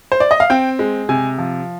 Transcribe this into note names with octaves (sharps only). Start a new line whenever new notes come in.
C5
D5
D#5
F5
C4 G5
G#3
C3 G#5
F3